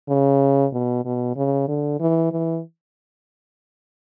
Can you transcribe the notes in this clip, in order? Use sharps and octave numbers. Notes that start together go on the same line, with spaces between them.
C#3
B2
B2
C#3
D3
E3
E3